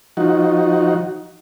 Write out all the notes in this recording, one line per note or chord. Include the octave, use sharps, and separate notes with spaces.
F3 D#4 F#4